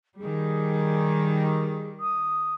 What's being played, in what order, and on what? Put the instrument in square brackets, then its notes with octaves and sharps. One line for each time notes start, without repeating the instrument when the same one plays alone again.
[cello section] D#3 G3 [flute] G#4
[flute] D#6